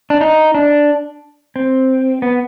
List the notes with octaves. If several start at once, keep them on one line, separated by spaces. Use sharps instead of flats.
D4
D#4
D4
C4
B3